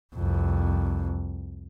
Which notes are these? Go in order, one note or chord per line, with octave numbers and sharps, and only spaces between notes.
C2 F2